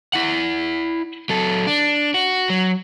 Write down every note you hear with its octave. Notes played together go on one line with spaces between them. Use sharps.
E4 F#5
F#3 A4
D4
F#4
F#3